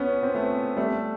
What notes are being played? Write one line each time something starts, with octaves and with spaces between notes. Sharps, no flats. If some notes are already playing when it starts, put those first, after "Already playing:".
Already playing: B3 C#4
C4
A3 B3
G3 A3